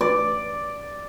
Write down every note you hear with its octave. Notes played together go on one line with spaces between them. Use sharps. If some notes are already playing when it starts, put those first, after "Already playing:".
D5